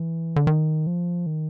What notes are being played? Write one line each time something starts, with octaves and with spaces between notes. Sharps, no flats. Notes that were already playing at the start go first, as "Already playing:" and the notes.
Already playing: E3
D3
D#3
F3
D#3